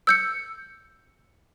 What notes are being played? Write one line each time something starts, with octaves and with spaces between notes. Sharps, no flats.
E6 G6 C#7